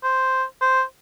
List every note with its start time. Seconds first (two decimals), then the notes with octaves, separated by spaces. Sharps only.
0.03 C5
0.61 C5